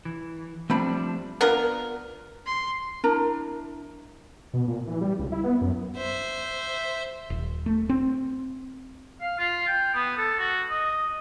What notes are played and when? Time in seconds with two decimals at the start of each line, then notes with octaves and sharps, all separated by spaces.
0.05 E3
0.70 F3 G3 A3 C4 D4 B5
1.41 B3 D4 F4 A#4
2.46 C6
3.04 D4 E4 A#4 A#5
4.54 B2
4.67 A#2
4.87 E3
5.01 G3
5.19 C#2
5.32 E4
5.44 B3
5.61 F#2
5.97 C5 E5
7.30 D#1
7.66 A3
7.89 C4
9.21 F5
9.38 F4
9.68 G5
9.94 B3
10.17 A4
10.39 F#4
10.70 D#5